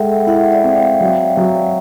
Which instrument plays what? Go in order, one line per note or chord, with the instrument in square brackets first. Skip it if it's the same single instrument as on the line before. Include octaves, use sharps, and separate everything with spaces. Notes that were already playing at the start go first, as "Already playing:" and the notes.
Already playing: [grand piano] G#3 A4 [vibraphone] E5 F#5 G5
[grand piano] E4 [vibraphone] E5 F#5
[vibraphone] D5 E5
[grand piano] C4
[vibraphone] F5 G5
[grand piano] F#3
F#3